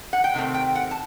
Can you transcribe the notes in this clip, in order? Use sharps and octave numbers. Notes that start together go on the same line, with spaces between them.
F#5
G5
C3 D#3 A3 C4
G5
F#5
A5